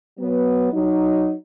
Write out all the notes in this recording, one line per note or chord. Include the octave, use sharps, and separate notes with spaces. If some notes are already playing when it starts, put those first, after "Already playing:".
F#3 B3
F#3 D#4